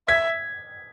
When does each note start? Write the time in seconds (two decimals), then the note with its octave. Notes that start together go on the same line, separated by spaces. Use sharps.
0.08 E5 G#6 B6